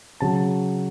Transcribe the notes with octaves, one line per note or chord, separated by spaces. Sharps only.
C#3 F#3 A5